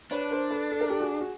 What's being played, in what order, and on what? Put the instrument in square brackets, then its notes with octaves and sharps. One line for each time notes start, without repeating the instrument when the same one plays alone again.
[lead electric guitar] D4 [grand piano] B4 C#5
[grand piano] A#4 C5
A4 B4
A4
A#4
G4 A4
F#4 G#4
F#4